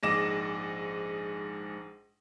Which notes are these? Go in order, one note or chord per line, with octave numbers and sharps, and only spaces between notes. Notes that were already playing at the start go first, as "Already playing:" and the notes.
A#1 G#2 D#5 D6 A#6 E7